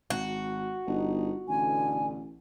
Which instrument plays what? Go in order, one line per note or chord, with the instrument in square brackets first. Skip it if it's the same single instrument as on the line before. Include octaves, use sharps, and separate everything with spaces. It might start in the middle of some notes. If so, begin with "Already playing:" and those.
[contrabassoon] G#1 [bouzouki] F#4
[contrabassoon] G1 [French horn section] B3 D#4
[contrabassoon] A1 [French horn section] B2 D3 [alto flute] G#5